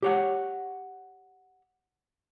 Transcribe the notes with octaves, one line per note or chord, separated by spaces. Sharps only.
G4 C#5 F#5